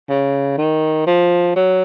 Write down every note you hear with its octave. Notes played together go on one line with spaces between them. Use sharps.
C#3
D#3
F3
F#3